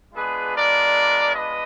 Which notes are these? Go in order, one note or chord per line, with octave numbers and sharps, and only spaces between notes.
G#3 B3 D4 F4 G#4 B4
A#4 D5
B4 D#5